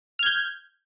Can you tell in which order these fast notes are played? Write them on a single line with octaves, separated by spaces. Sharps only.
F6 G#6 G6